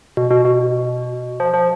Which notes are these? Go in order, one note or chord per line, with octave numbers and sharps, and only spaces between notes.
B2
B2
B2
F3
F3